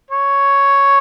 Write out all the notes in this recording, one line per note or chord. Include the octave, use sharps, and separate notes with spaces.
C#5